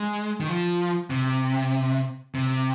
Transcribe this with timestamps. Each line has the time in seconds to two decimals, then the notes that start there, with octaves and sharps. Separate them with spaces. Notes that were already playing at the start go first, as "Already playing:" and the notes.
Already playing: G#3
0.40 D#3
0.48 F3
1.10 C3
2.35 C3